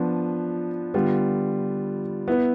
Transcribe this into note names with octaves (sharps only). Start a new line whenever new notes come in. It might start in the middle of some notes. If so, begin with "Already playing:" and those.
Already playing: F3 B3 D4
D3 G3 B3 F4
B3 E4 B4